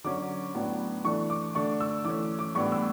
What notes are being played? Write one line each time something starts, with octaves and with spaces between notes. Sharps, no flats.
D3 F#3 C#4 D6
A2 F#3 B3 D4
E3 A3 D4 C#6
D6
D3 A3 D4 C#6
E6
E3 A3 C#4 D6
D6
A2 E3 G3 B3 D4 C#6
E6